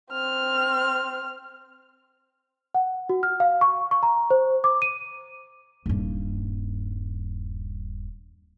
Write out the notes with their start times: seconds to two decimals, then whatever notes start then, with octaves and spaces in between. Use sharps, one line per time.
0.12 C4 F6
2.75 F#5
3.09 F#4
3.23 F6
3.40 F5
3.61 C#6
3.91 C#6
4.03 A#5
4.30 C5
4.64 D6
4.82 D#7
5.86 D#1 G2